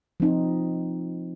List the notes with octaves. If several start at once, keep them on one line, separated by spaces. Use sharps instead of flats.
F3 C4 D#4